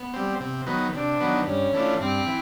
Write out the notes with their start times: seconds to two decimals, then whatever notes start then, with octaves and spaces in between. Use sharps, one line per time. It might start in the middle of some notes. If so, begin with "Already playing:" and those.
Already playing: B3
0.14 G3 C4
0.40 C3
0.66 D#3 F#3 B3
0.93 C3 D4
1.20 D#3 F#3 B3
1.46 G2 C#4
1.73 E3 A3 D4 F4
1.99 G2 C4
2.26 E3